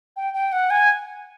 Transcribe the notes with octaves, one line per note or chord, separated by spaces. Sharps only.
G5
G5
F#5
G#5